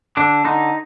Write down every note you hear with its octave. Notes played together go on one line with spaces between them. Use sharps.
D3 D4
D3 D#4